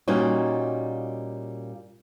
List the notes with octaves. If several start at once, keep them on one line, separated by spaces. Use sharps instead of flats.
A#2 G3 C#4 D#4 F#4